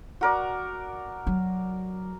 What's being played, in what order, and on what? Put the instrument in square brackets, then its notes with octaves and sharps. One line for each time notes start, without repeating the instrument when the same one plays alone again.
[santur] F#4 A#4 D5
[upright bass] F#3